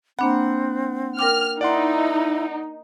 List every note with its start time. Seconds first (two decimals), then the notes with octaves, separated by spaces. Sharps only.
0.19 A#3 C4 D4 F#5 B5
1.19 A#4 G5 D6 F6
1.61 D#4 E4 D5 F#5 C6